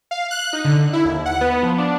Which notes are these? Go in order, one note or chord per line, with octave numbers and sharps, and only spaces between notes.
F5
F#6
D#4
D3
E4
D#2
F#5
B3
F3
D4